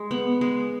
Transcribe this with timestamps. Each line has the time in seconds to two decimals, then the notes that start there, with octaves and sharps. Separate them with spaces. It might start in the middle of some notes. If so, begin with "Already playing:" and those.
Already playing: G#3
0.11 B3
0.41 G#3